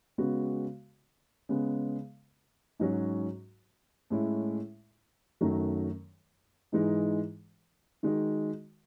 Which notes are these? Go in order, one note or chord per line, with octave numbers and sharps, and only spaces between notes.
C#3 G#3 B3 F#4
C#3 G#3 B3
G#2 F#3 C#4 F#4
A2 G#3 C#4 E4
F#2 D#3 F#3 A3
G#2 E3 G#3 D#4
D#3 G#3 D#4 F#4